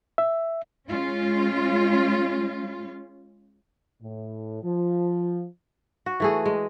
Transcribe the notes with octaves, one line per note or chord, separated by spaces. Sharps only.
E5
G#3 C#4 F4
A2
F3
F#4
E3 A3 G#4
G#3